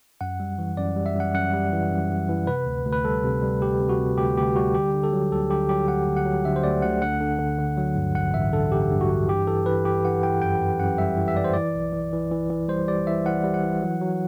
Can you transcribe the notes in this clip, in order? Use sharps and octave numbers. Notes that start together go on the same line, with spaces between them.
F#2 F#5
G3
E3
F#2 D5
G3
E5
F#2 F#5
F#2 F#5
G3
E3
F#2
F#2
E3
C3 B4
D2
D2
B4
G3 A4
C3
G3
D2 G4
C3
F#4
C3
D2 G4
D2 G4
G3 F#4
D3 G4
D3
A4
F#3
D2 A4
D3 G4
F#3 G4
D2 F#5
D2
F#5
F#3
D3 E5
C5
D2 D5
D2 F#5
D3 F#5
D3
D3
D3
F#3
G2
A1 F#5
A1 E5
D3 A4
A1 G4
G2
F#4
G2
E3 G4
E3 A4
E3 B4
E3 G4
E3 F#5
E3 G5
F#2 G5
F#2
F#2 F#5
G3 E5
E3
E5
E3 D5
C5
E3 D5
B1
E3
E3
E3
E3
G3 C5
G3 D5
E3 E5
E3 F#5
G3
F#5
E3
F#3
F#3